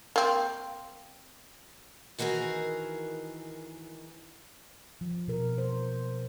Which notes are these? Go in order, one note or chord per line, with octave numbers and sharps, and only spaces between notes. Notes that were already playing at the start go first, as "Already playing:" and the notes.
A#3 C4
D#3 E3 F#4 G#4 A#4
F3
B2 A#4
C5